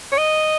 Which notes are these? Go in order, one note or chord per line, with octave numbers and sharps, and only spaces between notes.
C#5
D#5